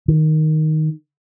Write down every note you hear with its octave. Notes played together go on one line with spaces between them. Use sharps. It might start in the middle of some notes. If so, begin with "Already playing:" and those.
D#3